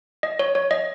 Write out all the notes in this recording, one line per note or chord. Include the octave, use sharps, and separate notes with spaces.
D#5
C#5
C#5
D#5